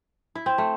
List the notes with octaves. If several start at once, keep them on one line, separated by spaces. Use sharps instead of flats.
E4
C4
A3